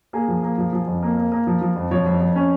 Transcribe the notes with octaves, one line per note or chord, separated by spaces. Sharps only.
A#3 G#4
F3
A#3
F3
F3
F2
A#3
A#3
A#3
F3
F3
F2
F3 C#5
F2
F2
C#4